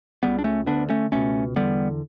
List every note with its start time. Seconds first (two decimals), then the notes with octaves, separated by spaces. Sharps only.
0.23 C#2 C#3 G3 B3
0.39 D4
0.44 A3 C#4
0.66 D2 D3 B3 D4
0.90 A3 C#4
1.12 C#2 B2 A3 C#4
1.56 E2 D3 G3 B3